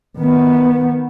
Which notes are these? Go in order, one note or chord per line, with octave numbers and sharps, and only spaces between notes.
D#3 B3